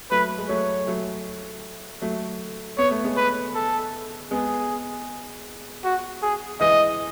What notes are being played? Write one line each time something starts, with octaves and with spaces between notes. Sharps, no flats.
F#3 A3 B4
G#3
F#3 A3 C#5
F#3 A3
F#3 A3
B3 C#5
A3
G#3 B3
B4
A4
G#3 B3 G#4
F#4
G#4
E3 G#3 D#5